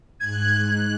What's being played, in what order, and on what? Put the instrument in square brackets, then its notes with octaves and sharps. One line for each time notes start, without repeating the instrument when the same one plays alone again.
[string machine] G#2 F#6 [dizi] G#6